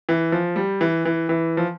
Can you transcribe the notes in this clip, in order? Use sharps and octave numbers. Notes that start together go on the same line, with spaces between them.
E3
F3
G3
E3
E3
E3
F3